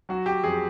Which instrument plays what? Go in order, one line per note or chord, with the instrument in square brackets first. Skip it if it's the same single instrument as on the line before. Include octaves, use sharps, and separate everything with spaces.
[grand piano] F#3 F#4
G4
F2 G#4